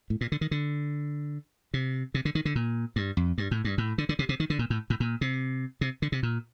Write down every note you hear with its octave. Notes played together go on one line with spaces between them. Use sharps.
A2
A#2
D3
D#3
D3
C3
C3
D3
D#3
D3
A#2
G2
F2
G2
A2
G2
A2
D3
D3
C3
C3
D#3
D3
A#2
A2
A2
A#2
C3
C3
D3
C3
A#2